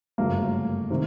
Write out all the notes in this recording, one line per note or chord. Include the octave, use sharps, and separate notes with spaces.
G1 F#2 C#3 F#3 A3 A#3
C3 D#3